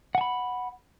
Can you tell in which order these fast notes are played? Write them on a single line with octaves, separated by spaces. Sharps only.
F#5 G#5 B5